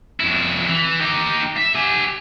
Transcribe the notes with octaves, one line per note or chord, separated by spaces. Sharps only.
F2 E4
E3
D#4 G4
E5
G4 G#5